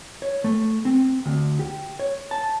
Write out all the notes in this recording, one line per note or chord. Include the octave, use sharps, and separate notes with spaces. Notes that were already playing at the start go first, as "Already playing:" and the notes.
C#5
A3
C4
D2
G4
C#5
A5